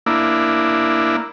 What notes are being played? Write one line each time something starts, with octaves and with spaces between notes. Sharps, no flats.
A#3 D4 E4